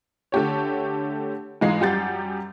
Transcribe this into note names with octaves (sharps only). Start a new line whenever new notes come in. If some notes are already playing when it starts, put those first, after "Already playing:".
D3 A3 G4 C#5
G#2 E3 G#3 D#4 F4 C7
F#2 G3 G4 F#5 G6 A6